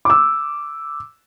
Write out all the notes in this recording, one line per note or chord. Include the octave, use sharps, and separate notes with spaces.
D6 E6